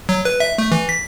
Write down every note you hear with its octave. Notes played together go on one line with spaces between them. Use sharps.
F#3
B4
E5
A3
E3
B6